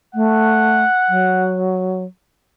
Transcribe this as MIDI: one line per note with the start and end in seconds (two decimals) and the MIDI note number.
0.15 0.83 57
0.15 1.61 78
1.09 2.04 54